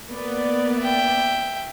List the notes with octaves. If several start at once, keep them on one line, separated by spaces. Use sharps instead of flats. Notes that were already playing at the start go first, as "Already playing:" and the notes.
A#3 B3 D5
E5 G5